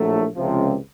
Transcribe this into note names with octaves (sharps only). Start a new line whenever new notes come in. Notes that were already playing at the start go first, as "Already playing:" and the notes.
Already playing: A#1 A2 F#3 A3
C#2 C3 F3